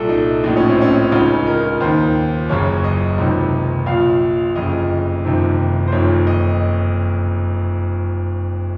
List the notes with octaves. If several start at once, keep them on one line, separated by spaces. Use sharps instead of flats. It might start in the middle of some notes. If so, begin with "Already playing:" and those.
Already playing: C2 A#2 A4
D#4
A#1 A2 D#4
C#4
C4
C#4
C#2 C#3 D#4
A#4
D#2 D#3 C5
F#1 F#2 C#3 C#5
D#5
C#2 C3 D#3
A#1 A#2 F5
F#1 F2 C#3 D#5
F#1 F2 C3 D#3
C5
F#1 F2 D#3 C#5
D#5